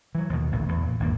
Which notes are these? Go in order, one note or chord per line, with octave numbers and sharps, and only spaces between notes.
E3 F#3
D#2 B2
A1 D2 A#2
E2
A#2
G#1 E2 A#3